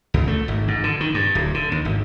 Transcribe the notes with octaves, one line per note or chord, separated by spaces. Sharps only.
C#2
A3
G#1
G#2
D3
D#3
G2
D1
D3
D#2
G#1